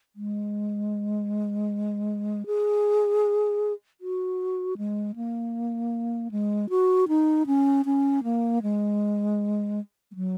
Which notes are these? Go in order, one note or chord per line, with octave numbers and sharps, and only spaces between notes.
G#3
G#4
F#4
G#3
A#3
G#3
F#4
D#4
C#4
C#4
A#3
G#3
G#3
F#3